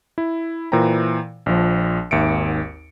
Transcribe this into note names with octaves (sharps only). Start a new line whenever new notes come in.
E4
A#2 E3 C5 G5 A#5
A#1 F3
G#1 D#2 E5 C#7 D7